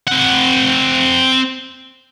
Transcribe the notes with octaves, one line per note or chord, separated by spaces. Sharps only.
C4 F#5